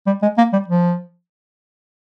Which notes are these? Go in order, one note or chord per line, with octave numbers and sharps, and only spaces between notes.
G3
G#3
A#3
G3
F3